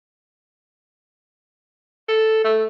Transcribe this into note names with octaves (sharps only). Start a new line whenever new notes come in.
A4
A3